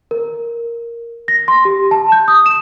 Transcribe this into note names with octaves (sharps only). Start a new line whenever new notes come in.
A#4
A#6
C6
G4
A5
G6
D#6
E7